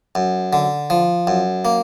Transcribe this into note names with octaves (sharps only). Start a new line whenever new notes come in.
F#2
D3
F3
F#2
A#3